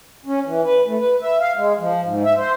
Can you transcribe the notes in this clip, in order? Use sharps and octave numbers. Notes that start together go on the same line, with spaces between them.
C#4
E3
B4
A3
B4
E5
F5
G#3
F3
G#2
E5
C5